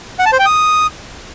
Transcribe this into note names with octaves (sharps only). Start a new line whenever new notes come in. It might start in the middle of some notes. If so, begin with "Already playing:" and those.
F#5
A5
C5
G5
D#6